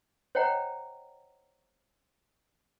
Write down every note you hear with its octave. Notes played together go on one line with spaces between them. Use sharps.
C5 C#5 D#5 F#5 G5 A#5